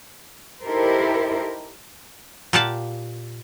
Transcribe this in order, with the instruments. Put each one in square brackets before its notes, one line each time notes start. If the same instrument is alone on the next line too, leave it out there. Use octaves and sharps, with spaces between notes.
[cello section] D#4 E4 G4 A4 A#4 C5
[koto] A#2 G4 F5 F#5 A5